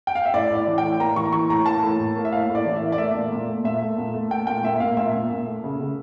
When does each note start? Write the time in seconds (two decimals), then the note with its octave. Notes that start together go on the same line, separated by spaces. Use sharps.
0.07 G5
0.15 F5
0.26 E5
0.34 A2 D5
0.50 A2 D5
0.67 E3
0.78 G5
0.84 A2
1.00 A#3 A#5
1.16 E3 C#6
1.26 A#5
1.33 E3 C#6
1.49 A2 A#5
1.66 A#3 A5
1.83 A2
2.00 A2
2.16 A#3
2.25 E5
2.32 A2 F5
2.49 A2
2.55 D5
2.66 E3
2.76 E5
2.82 A#3
2.92 D5
2.98 A3 E5
3.15 A#2
3.32 A#2
3.48 A3
3.64 A#2 E5
3.82 A3
3.98 A#2
4.14 A3
4.31 A3 G5
4.47 A#2 G5
4.63 A#2 E5
4.80 A#2 F5
4.97 A#2 E5
5.13 A#2
5.31 A#2
5.46 A3
5.64 C#3
5.80 C#3